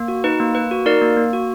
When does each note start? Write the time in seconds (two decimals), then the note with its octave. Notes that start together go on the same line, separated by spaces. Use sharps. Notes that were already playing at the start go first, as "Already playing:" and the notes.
Already playing: A#3
0.08 F#4
0.24 D#4 B4
0.40 A#3
0.55 A#3 B4
0.71 F#4
0.86 D#4 A#4 D5
1.01 A#3
1.17 A#3
1.33 F#4